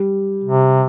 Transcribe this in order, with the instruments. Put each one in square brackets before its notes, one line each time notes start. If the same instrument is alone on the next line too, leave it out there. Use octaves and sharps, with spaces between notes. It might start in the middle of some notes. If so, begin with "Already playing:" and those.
Already playing: [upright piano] G3
[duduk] C3